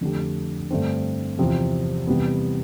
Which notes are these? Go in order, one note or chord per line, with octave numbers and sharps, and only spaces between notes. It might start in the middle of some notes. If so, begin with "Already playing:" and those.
F2 D3 A3 D4 G4
G2 D3 A3 C4
E2 C3 F3 C4
E2 C3 G3 B3